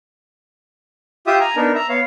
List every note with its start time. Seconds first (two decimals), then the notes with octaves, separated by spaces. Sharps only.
1.27 F4 G4 E5 D#6
1.40 G#5 A#5
1.56 B3 D4 D#4 A#4
1.75 E5 A#5
1.89 B3 C#5 F5